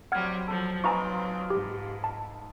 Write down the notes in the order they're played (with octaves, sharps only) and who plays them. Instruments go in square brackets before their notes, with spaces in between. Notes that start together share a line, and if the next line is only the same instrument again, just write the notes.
[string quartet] F#3 G3 C4 [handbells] F#5 F6 G#6
[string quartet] F3 F#3 [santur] A4
[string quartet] F#3 C4 [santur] D#4 F4 B4 [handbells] G#5 A#5 C#6
[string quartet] G#2 [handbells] G4
[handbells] A5